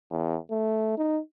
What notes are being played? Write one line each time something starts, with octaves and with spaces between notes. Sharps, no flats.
E2
A3
D#4